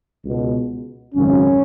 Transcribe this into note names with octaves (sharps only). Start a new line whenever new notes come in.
C#2 B2
G#1 F#2 C#3 C#4